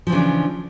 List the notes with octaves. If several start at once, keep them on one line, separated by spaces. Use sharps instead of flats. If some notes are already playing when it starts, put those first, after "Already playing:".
C#3 E3 F3 C#4 D4